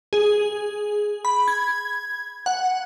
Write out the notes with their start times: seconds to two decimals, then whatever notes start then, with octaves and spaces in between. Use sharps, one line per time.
0.13 G#4
1.25 B5
1.48 G#6
2.46 F#5